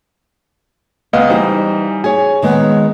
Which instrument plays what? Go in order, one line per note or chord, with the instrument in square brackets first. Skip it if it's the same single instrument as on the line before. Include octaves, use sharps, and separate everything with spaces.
[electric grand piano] C#2 D#5 F5 [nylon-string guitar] B3
[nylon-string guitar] E3 C5 [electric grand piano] G3 D#4
[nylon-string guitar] G#4 [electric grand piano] C#5 G#5
[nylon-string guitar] D#3 G#3 B3